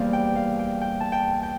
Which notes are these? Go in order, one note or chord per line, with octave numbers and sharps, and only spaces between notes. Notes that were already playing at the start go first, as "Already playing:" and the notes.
Already playing: E2 E3 G3 A#3 C5 D5 F5
G5
F5
G5
G5
A5
G5
G5